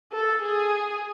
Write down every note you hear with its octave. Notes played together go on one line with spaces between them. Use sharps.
A4
G#4